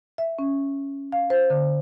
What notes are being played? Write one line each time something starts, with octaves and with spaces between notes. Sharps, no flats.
E5
C#4
F5
C5
D3